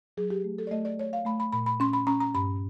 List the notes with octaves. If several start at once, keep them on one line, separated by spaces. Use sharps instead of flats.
F#3 G#4
G4
A3
A4
D5
A3 D#5
D5
A3 C#5
F5
A3 B5
B5
A#2 B5
B5
C#4 C6
B5
C#4 A#5
A#5
G2 B5